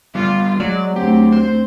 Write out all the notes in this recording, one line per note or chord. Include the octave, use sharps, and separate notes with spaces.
G3 B3 F4
F#3 G#3 D5
D2 C4 G4
C5